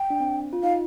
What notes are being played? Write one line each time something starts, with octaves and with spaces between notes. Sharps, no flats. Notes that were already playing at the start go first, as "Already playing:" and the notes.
Already playing: G5
D4
C4
F4
D#4 F5